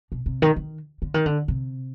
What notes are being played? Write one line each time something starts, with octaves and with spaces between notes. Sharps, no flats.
B2
C3
D#3
D#3
D3
D#3
D3
C3